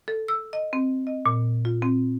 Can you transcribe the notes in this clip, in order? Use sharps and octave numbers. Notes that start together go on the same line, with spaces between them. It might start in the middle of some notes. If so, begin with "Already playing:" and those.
A4
E6
D#5
C4
D#5
A#2
F4
C4